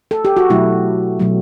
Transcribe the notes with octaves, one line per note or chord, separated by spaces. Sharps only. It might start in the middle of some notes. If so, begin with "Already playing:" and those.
A4
G4
F#4
B2 F#3 A3 E4
B2 F#3 A3